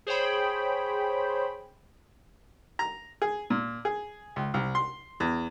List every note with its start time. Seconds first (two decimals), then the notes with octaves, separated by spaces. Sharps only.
0.07 G#4 C5 C#5 G5 B5
2.79 A#5
3.22 G#4
3.50 A#2
3.85 G#4
4.36 C#2
4.54 C2
4.75 C6
5.20 E2